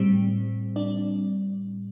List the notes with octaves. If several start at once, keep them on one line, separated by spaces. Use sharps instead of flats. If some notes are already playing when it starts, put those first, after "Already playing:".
Already playing: A2 G3 C4
D4 D5